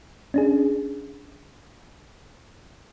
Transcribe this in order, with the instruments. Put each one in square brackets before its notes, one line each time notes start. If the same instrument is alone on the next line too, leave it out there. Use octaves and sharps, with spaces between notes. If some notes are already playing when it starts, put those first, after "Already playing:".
[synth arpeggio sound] C#4 D4 G#4